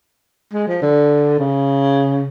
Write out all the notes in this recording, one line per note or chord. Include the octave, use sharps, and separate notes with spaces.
G#3
F3
D3
C#3